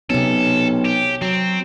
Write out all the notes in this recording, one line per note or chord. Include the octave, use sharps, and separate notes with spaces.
B1 C3 C#4 A4
G4
F#3 C4